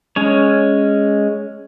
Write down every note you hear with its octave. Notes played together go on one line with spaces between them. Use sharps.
G#3 C#4 C#5